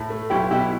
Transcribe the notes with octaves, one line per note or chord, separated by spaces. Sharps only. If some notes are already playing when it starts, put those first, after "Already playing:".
Already playing: A2
A3
B1 E4 G4
B2 E4 G4